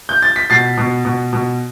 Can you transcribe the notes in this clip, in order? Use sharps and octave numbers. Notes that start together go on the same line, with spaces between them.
G6
A6
B6
B2 A6 C7
B2
B2
B2